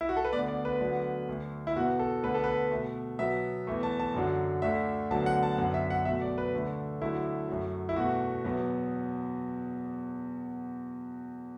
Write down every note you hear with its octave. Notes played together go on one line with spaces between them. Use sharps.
E4
F#4
A4
B4
D2 D3 B3 D5
D5
B4
D2 D3 F#3 B3
D2 D3 A3
E4
E2 B2 B3 F#4
A4
D2 D3 B3 B4
A4
B4
B2 A3
B2 F#3 B3 E5
E2 E3 A3
A5
A5
F#2 D3 F#3
D2 D3 A3 E5
D2 D3 F#3 B3 A5
F#5
A5
F#2 D3 B3 F#5
E5
F#5
B2 F#3 A3 E5
D5
B4
D2 D3 A3
D2 D3 F#3 A3 E4
F#2 F#3 A3
E4
E2 B2 A3 F#4
E2 B2 F#3 B3